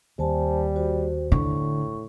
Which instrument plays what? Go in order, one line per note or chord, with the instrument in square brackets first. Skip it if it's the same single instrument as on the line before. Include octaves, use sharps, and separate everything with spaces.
[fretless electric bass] D#2 [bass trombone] G3 [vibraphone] C5 G#5 A5
[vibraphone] F#4 C5
[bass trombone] A2 [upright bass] D3 [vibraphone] C#6